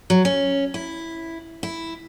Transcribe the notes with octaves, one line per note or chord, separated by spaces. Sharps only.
F#3
C#4
E4
E4